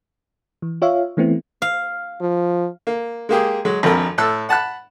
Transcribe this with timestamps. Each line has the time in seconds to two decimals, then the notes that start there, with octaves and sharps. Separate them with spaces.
0.62 E3
0.82 F4 C#5 E5 F5
1.17 E3 A3 B3 C4 E4
1.62 F5
2.21 F3
2.87 A#3
3.29 G#3 A#3 G4 G#4
3.65 F#3 G#3
3.83 G#1 F2 D3 A#4 B5
4.18 A2 A4 E6 F#6
4.49 F#5 A5 B5 F#6